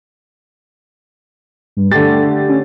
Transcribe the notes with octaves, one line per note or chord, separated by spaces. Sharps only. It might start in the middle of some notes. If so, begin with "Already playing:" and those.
G2
D3 A3 G4 A6
C#4